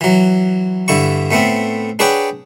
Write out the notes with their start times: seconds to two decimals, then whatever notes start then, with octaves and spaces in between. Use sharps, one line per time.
0.01 E3 F#3
0.88 G2 D3 E4 C#6
1.31 A2 A3 B3 C4
1.99 D4 G#4 B4 C#5 F#5 G5